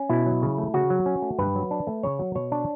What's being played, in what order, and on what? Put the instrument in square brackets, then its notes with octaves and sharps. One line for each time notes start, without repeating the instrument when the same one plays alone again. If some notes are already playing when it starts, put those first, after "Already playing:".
Already playing: [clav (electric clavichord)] C#4
B2 E4
F#3
C#3
A3
C#3 F#4
F#3
C#4
A3
G2 B4
F#3
D4
A3
C#3 C#5
F#3
B2 C#5
D4